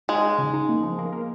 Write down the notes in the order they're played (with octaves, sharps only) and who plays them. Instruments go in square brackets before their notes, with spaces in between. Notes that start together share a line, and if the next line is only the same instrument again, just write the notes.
[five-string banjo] G#3 [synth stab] D#4
[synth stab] D#4
C#3
D#4
A#3
F3
A#3
A#3